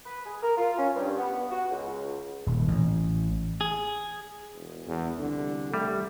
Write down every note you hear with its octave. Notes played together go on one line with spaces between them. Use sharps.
B4
G#4
A#4
F4
C#4
G2
B3
F#4
C#2
D#1
A1
G#4
E1
E2
C2 D3
G3 A3